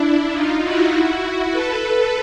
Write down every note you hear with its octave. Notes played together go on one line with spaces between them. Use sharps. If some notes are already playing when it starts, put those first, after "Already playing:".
Already playing: D4 E4
D#4 F4
E4 F#4
A4 B4